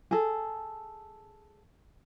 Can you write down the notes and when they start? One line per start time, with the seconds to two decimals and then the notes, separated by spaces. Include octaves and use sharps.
0.11 G#4 A4